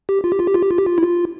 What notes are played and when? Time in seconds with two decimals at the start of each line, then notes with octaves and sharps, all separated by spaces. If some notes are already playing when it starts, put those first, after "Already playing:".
0.09 G4
0.24 F4
0.32 G4
0.39 F4
0.47 G4
0.54 F4
0.63 G4
0.71 F4
0.78 G4
0.86 F4
0.98 E4
1.02 F4